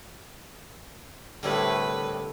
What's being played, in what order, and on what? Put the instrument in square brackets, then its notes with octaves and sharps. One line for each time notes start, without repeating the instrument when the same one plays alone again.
[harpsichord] C2 A2 G3 [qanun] D3 A3 A4 [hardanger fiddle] B4